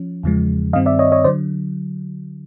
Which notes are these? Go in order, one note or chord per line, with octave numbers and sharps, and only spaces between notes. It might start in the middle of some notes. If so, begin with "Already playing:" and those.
Already playing: F3 C#4
E2 C#3 F3 G#3
G2 D#3 G3 C4 D#5 F5
D5 E5
C#5 D#5
C#5 D#5
D3 F#3 C5 D5